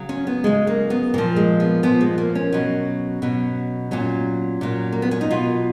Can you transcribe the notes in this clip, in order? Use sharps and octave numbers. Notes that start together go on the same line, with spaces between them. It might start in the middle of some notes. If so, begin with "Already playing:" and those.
Already playing: C#3 F#3
C#4
B3
C#3 F#3 G#3
A#3
B3
A#2 F3 A#3
G#3
B3
A#2 F3 B3
G#3
A#3
C#4
B2 F#3
B2 F#3
A#2 F#3 C#4
A#2 F#3
A#3
B3
C#4
D#4
B2 F#3 F4